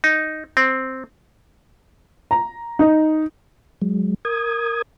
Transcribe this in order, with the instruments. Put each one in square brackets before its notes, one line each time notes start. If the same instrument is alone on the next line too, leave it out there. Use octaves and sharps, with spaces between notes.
[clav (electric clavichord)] D#4
C4
[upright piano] A#5
D#4
[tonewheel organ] F#3 G#3
A#4 D#6 G#6